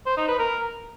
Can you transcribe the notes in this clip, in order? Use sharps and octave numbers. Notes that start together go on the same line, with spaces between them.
C5
D#4
B4
A#4